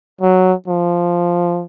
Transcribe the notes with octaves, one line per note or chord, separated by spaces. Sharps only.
F#3
F3